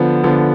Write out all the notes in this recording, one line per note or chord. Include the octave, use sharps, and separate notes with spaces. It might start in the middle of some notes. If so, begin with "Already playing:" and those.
Already playing: D3 F3 B3
D3 F3 B3